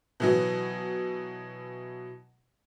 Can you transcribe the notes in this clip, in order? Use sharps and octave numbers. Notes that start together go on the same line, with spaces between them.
B2 E3 F#3